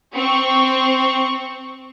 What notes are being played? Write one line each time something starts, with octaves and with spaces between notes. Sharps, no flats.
C4 C#6